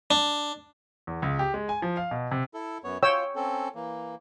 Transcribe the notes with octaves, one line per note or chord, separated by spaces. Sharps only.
D4
E2
C#2
G4
G#3
G#5
F3
F5
B2
C3
E4 A4
F#2 B3 C#5
F4 C#5 G5 E6
C4 C#4 A4
E3 A#3